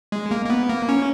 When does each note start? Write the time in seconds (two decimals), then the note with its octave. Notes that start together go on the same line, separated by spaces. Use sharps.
0.12 G#3
0.31 A#3
0.45 A#3
0.50 B3
0.69 A#3
0.89 C#4